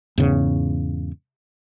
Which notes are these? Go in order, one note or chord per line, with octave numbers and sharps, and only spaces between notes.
E2 G#2 C#3